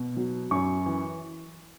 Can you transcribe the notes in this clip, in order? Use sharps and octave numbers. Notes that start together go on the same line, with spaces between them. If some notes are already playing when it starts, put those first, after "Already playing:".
Already playing: B2
F#3
F#2 C#6
E3